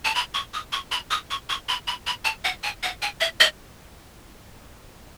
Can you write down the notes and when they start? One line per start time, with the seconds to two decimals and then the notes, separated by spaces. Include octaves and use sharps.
0.05 A5
0.15 B5
0.34 C#6
0.54 D#6
0.73 C#6
0.92 B5
1.11 D#6
1.31 C#6
1.49 C#6
1.69 B5
1.88 B5
2.07 B5
2.25 A5
2.45 F#5
2.63 G#5
2.83 F#5
3.02 G#5
3.21 E5
3.40 D#5